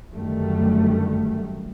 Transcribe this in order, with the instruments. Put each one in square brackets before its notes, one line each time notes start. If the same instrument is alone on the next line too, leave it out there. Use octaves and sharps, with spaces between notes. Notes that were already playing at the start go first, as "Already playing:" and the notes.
[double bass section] F#2 D3 D#3 G3 A3